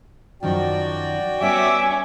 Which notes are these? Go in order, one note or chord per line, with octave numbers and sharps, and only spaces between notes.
F#2 D#3 F3 F#4 D5 G5
G3 B3 C#4 E5 D6